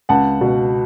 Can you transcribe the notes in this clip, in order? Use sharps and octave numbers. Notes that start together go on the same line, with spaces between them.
C#2 F#5 A5
B2